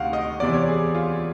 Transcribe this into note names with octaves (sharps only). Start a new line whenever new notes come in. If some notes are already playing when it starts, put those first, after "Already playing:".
Already playing: D2 C3 D#3 F5 F#5
D#5
E2 C3 E3 D5
C#5
G#4
F4